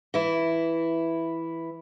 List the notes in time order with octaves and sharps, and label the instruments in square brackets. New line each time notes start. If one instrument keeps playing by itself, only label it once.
[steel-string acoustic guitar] E3 E4